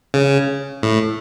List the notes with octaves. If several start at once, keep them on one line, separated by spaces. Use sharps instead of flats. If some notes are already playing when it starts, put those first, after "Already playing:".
C#3
A2